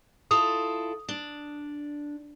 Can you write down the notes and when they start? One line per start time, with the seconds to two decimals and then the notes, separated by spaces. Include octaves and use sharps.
0.31 E4 F4 A4 D#6
1.09 D4